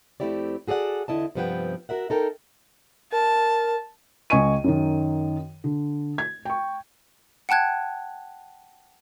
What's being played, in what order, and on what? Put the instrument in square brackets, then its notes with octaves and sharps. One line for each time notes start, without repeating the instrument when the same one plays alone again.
[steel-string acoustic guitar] F2 A3 C4 E4 G4 D5
F#4 G#4 A4 D5 F#5
E2 D3 E4 D#5 A5
G2 C3 F3 B3 F#5 G5
F#4 A#4 E5 F#5
D#4 A4 A#4 G5
[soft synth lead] A#4 [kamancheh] A5
[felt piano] C#2 D#5 G#5 C#6 D#7
F#2 D#3
D3
G#6
G5 C#6
[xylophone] F#5 G5 A5 F#6 G#6